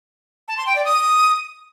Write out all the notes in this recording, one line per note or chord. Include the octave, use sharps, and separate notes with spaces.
A5
C6
G5
D5
D#6